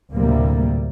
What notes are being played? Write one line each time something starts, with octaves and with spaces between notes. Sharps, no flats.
D2 A2 C3 G3 A#3